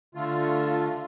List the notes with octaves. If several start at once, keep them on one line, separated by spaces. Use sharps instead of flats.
D3 A3 F4